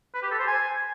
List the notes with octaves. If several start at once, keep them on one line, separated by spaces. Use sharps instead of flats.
B4
G4
A4
C5
G#5